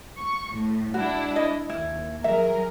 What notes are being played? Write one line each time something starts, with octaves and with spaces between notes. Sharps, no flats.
C#6
A2
G#3 D4 E4 F#4
D#5
D#2 E4
F#3 G#4 A#4 E5